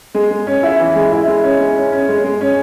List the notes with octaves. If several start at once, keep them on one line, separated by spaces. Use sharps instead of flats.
G#3
G#3
C#4
E4
E3
G#3
E4
G#3
C#4
G#3
C#4
C#4
G#3
G#3
C#4